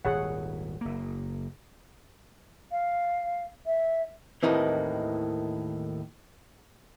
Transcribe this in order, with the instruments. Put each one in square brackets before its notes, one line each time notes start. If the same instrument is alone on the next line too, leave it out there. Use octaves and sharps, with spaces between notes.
[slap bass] D#1 G#1 [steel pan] G#4 C#5 F#5
[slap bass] F#1 A#3
[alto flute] F5
E5
[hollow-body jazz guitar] D#2 A2 D#3 E3 C4